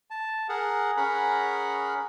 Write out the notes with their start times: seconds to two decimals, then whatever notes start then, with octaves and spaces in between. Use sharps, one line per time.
0.10 A5
0.49 G#4 A#4 F#5
0.97 C#4 G#4 A#4 F#5 B5